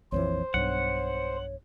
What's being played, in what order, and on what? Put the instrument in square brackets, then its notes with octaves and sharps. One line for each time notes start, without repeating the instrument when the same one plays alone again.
[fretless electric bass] A#1 F2 E3 [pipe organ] C5 [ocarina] C#5
[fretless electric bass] B1 G2 [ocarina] C#5 [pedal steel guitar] F#5